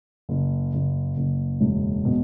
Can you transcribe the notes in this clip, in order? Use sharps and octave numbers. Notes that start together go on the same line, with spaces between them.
F#1
F#1
F#1
E1
B2